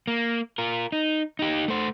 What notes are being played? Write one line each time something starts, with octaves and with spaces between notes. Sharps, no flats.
A#3
F4 A#4
D#4
D#4 G4
A3 C5